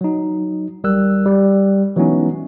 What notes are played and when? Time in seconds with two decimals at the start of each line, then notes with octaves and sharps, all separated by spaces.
0.01 F#3 D#4
0.84 G#1 G3 A#4 E6 F#6
1.26 G3
1.96 E3 F#3 G#3 B3 C#4 D#4